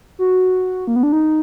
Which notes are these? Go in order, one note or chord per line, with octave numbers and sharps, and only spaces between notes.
F#4
A#3
B3
D4
D#4